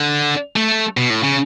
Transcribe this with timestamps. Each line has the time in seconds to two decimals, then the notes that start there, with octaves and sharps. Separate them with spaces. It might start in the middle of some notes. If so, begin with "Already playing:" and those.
Already playing: D3
0.56 A3
0.97 B2
1.10 A2
1.23 C#3